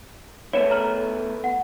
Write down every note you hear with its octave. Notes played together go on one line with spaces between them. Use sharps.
A3 B3 E4 C#5 C#7 E7
A#5 F6 F#7
F#5